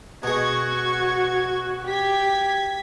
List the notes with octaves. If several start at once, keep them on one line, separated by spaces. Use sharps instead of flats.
B2 G#3 F#4 C#6 G#6
G4 G#6 B6